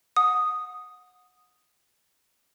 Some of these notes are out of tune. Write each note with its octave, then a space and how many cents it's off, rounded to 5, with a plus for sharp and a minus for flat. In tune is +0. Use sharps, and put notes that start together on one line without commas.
F#5 -25 D#6 +0